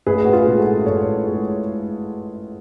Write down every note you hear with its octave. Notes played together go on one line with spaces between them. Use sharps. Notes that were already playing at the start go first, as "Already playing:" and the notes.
A1 G#4 B4
F#4
F4 G#4
A2 G#3
F#4 A4
A1 A4 C#5
G#3